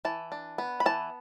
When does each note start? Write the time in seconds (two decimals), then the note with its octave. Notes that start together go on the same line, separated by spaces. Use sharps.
0.05 E3 A5
0.32 D4
0.58 B3
0.80 B5
0.86 E3 A5